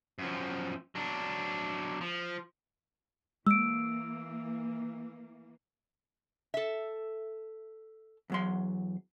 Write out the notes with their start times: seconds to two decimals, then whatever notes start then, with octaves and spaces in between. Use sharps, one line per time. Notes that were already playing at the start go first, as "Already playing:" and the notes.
0.18 F#2 F3
0.95 F#3 D4
2.01 F3
3.47 E3 G#3 A#3 E6 D7
6.54 A4 E5
8.30 E2 F#3 C6